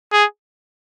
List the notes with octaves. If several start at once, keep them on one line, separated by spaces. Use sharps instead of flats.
G#4